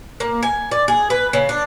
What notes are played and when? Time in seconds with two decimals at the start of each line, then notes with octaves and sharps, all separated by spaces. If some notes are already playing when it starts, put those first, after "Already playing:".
0.20 A#3
0.43 G#5
0.71 D5
0.88 G#4
1.10 B4
1.33 C#3
1.49 D4